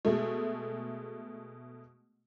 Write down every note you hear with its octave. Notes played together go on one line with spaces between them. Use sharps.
B2 G#3 A3